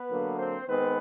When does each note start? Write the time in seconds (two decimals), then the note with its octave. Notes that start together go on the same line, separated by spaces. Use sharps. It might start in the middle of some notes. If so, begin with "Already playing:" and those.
Already playing: B3 B4
0.09 D3 F#3 A#3
0.38 C4 C5
0.67 D#3 G#3 B3 C4 B4